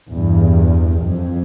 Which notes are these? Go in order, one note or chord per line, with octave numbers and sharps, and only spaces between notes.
E2 G2
F2